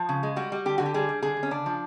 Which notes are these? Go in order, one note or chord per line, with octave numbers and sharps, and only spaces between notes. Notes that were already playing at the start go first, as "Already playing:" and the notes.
Already playing: F3
C#3
G#3
G3 F#4
G3
D3 G4
D3 F#4
G4
G3 G#4
G3
D3 G#4
D3
C#4
C#3 D4
F3